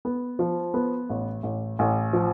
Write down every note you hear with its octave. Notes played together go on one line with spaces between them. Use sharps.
B3
F3
B3
A1
A1
A1
F3